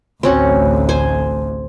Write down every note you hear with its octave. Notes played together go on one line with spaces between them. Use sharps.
A1 D2 C4 C#4 F#4
C5 G#5